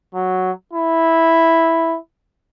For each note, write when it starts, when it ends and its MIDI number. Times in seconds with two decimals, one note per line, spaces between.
0.14 0.51 54
0.73 1.97 64